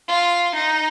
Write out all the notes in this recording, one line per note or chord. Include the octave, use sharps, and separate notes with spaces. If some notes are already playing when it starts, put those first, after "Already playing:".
F4
D#4